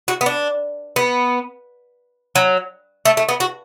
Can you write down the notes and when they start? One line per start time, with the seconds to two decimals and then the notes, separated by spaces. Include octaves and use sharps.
0.08 F#4
0.21 B3
0.26 D4
0.96 B3
2.35 F#3
3.05 A3
3.17 A3
3.29 B3
3.40 F#4